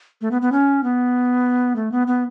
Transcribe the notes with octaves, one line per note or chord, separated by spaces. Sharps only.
A3
B3
B3
C#4
B3
A3
B3
B3